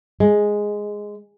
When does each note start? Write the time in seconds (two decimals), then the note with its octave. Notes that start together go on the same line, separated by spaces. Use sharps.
0.20 G#3